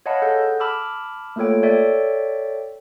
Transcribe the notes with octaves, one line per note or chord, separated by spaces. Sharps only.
C#5 D#5 F5 F#5 A5 B5
G#4 A4 F#5 E6 G6
A5 B5 D6 E6 F6
A3 A#3 F4 A4 C#5 G5
A4 C#5 D5 E5 G5